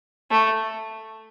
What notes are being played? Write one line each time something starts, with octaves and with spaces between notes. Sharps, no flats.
A3